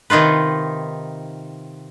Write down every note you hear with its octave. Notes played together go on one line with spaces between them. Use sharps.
C3 D#3 D#4 F4 B4